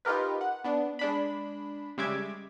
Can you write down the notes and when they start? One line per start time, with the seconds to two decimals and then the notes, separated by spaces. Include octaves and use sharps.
0.05 D#4 F4 G4 A#4 B4
0.41 F#5
0.64 B3 D4
0.99 G#3 D4 B5
1.98 C#3 G3 G#3 E5 D6 G#6